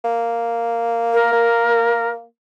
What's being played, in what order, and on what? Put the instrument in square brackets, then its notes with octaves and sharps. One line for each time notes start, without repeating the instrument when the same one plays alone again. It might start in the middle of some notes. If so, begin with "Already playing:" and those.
[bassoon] A#3
[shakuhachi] A#4
[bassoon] A#3